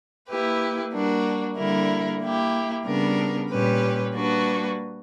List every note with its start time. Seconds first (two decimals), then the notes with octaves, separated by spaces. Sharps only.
0.28 A#3 E4 G4 B4
0.93 G3 A#3 D4 F#4
1.57 D3 G3 A#3 E4 A#4
2.21 A#3 E4 G4
2.86 C#3 G3 B3 D4 A#4
3.50 A#2 G3 C#4 G4 B4
4.14 G3 A#3 D4 F#4 B4